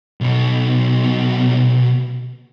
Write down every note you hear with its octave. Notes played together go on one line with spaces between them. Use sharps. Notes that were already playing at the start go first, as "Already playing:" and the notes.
B1 B2